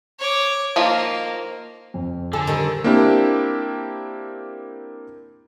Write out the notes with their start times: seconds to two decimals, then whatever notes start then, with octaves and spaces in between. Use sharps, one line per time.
0.19 C#5 D6
0.76 D#3 F3 A#3 F4
1.94 F2
2.33 D3 A4 G#5
2.47 D#3 G3 A4
2.84 A#3 C4 D4 E4 G4